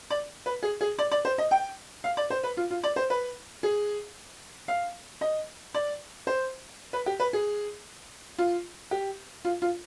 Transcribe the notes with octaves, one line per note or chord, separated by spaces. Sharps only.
D5
B4
G#4
G#4
D5
D5
C5
D#5
G5
F5
D5
C5
B4
F4
F4
D5
C5
B4
G#4
F5
D#5
D5
C5
B4
G4
B4
G#4
F4
G4
F4
F4